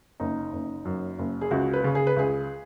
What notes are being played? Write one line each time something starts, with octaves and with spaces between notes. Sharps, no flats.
F#1 D#4
F#1
F#2
F#1
G#4
C#2 F#4
B4
C#3
G#4
B4
C#2 G#4